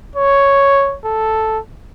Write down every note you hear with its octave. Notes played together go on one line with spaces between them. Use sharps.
C#5
A4